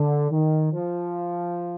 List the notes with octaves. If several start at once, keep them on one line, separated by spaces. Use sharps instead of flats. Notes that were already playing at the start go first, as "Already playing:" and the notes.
Already playing: D3
D#3
F3